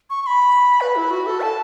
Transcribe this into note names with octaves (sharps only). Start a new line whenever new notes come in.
C#6
C#6
B5
B4
E4
F#4
A4
A5